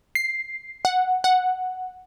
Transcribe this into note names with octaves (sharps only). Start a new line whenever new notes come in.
C7
F#5
F#5